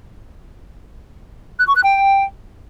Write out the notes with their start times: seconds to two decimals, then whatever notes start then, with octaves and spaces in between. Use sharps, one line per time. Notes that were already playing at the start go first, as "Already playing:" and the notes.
1.58 F#6
1.67 C#6
1.75 F#6
1.84 G5